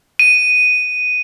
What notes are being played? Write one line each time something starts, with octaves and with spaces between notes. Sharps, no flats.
D#7